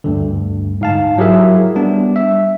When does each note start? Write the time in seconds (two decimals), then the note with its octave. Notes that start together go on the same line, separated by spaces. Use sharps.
0.04 D2 G2 D3
0.81 G#2 F5 A5
1.18 F#3 E4 G4 G#4 A#4 E5
1.75 G3 B3 D4
2.16 E5